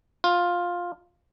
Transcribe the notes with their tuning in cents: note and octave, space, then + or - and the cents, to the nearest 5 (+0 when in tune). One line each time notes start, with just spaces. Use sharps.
F4 +10